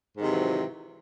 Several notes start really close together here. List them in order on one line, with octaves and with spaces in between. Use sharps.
G#2 D#3 C3 E3 F#3